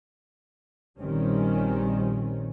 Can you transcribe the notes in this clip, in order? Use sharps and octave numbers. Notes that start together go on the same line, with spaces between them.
A#1 D#3 G3 C4 C#4